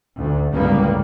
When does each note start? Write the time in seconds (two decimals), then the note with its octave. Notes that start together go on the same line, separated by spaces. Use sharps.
0.15 D2
0.52 G1 C#2 A2 G3 A#3 B3